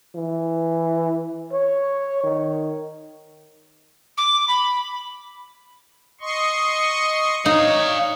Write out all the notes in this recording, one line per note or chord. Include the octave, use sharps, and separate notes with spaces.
E3
C#5
D#3
D6
B5
D#5 C6 C#6
D#4 C#5 D5 F5